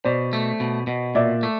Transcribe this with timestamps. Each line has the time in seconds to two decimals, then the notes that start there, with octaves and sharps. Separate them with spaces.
0.04 B2 C5 D5
0.33 A3
0.60 B2
0.87 B2
1.15 A#2 D5 E5
1.43 A3